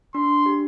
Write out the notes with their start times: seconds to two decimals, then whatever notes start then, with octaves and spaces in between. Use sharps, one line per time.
0.15 D4 C6
0.46 G4